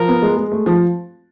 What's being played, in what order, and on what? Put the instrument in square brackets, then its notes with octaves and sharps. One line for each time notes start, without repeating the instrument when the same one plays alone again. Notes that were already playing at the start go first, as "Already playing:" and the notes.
Already playing: [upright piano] F3 [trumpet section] A#4
[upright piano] B3
G#3
G#3
A3
F3